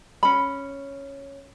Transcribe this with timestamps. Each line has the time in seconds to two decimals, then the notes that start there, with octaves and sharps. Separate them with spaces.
0.23 C#4 B5